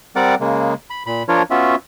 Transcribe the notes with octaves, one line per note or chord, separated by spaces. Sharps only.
G3 C4 A#4 D5 F#5 D6
C#3 G#3 A#3
B5
A#2 B5
F3 D4 F4 A#4 C#5
B3 C#4 F4 F#4 E5